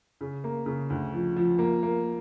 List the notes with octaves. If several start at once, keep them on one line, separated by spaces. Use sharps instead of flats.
C#3
A#3
C#3
D2
F3
F3
A#3
A#3